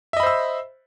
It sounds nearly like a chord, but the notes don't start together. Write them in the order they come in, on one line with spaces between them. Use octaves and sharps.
E5 D#5 B5 C5 E6